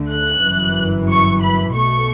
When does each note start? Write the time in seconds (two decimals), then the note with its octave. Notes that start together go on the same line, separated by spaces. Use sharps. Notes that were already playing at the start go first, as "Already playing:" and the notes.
Already playing: D2 D3 A3
0.11 F#6
0.44 G1 F#2 E3
1.09 C#6
1.41 B5
1.75 B1 B2 A3 C#6